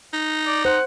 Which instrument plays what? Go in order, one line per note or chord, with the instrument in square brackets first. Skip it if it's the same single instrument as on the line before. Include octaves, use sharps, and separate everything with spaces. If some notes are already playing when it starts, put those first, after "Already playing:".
[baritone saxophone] D#4
[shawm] D5
[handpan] C5 [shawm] F#5